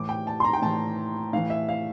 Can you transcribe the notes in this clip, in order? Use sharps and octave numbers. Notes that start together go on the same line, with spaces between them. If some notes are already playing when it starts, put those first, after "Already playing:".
Already playing: A2 E3 D6
G5
A5
C6
A#5
G5
A2 E3 A5
A2 E3 F5
E5
F5